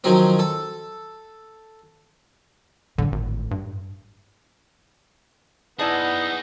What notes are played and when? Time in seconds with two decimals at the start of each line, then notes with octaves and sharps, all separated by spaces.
0.04 D#3 F3 F#3 C4
0.39 A4
2.98 A2 D3 E3
3.12 G#1
3.51 G2
5.79 B3 D#4 E4 G#4 D5 F#5 A5